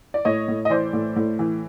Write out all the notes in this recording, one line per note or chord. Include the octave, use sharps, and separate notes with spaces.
D5
A2 C#5 D#5
A2
D#5
E3 C5 D5
A2
A2
E3